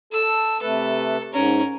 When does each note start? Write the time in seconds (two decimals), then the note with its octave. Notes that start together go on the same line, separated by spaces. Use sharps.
0.13 A4 E6
0.62 C3 A3 A4 B4
1.33 G#2 C#4 A#4